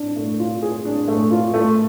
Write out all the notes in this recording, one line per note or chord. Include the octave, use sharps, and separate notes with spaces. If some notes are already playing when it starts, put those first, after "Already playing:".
Already playing: D4
A3
F4
G#4
D4
A3
F4
A3